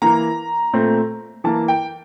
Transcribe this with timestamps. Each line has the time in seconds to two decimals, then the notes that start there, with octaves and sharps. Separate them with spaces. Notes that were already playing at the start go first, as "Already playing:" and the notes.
0.02 E3 A#3 A#5
0.73 A#2 A3 C4
1.44 E3 A#3 A5
1.68 G5